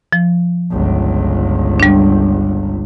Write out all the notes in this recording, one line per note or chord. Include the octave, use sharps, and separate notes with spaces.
F3
G1 C#2
G3 D4